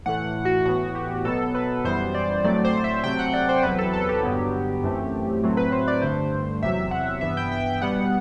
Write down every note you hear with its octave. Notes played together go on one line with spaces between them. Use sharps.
A2 E3 A3 F#5
F#4
A2 E3 B3 F#4
G4
B2 F#3 B3 A4
B4
F#2 E3 G3 B3 C5
D5
A2 F#3 A3 C4 D5
C5
E5
C3 F#3 A3 C4 G5
F#5
D5
C5
E2 C3 F#3 B4
A4
A4
G4
G2 D3 F#3 B3
F#2 E3 A3 C4
A2 F#3 A3 C4
B4
C5
D5
G2 D3 A3 C5
E2 C3 F#3 E5
F#5
G2 E3 B3 E5
G5
G5
G5
B2 G3 B3 F#5